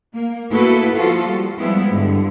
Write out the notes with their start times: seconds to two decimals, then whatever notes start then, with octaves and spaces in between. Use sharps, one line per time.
0.14 A#3
0.51 A#3 B3 E4 F#4 A4 B4
0.95 F3 F4 F#4 A4
1.27 G3
1.58 F3 G3 G#3 B3 E4
1.89 G2 D3